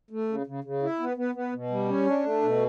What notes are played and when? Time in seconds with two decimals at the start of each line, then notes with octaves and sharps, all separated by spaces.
0.10 A3
0.28 C#3
0.46 C#3
0.64 C#3
0.82 E4
1.00 B3
1.17 B3
1.35 B3
1.53 B2
1.70 G3
1.89 C#4
2.07 D4
2.24 A3
2.42 B2